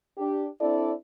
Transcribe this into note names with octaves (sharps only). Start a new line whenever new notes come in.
D4 G4
C4 D4 E4 A4 D5